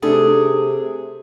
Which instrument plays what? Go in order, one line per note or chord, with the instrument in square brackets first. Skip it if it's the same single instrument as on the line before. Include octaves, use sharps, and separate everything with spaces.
[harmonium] C3 [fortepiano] A3 D4 A4 [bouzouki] G#4